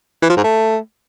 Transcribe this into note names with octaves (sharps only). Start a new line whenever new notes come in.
E3
F3
G#2
A3